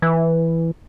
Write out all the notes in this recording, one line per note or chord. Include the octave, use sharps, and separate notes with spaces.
E3